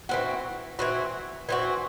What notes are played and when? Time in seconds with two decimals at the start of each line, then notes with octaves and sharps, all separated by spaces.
0.09 E3 C4 F#4
0.79 E3 C4 F#4
1.49 E3 C4 F#4